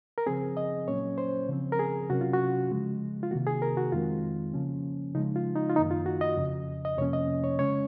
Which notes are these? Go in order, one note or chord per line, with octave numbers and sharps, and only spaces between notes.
A#4
C#3 F3 C4 G#4
D#5
A#2 F#3 A#3 C#4 C#5
C5
C#3 F3 C4
A#4
G#4
C3 F#3 C#4 F#4
F4
F#4
C#3 F3 G#3
F4
C3 D#3 A#3 F#4
G#4
A#4
F#4
F2 D#3 G#3 C4 F4
C#3 F3 A#3 C#4
C#3 F3 G#3 D#4
F4
D#4
F4
F#2 D#3 A#3 D#4
F4
F#4
D#5
F2 C#3 F3
D#5
F2 C3 F3 A#3 C#4 C#5
D#5
C#5
C#3 G#3 C#4 C#5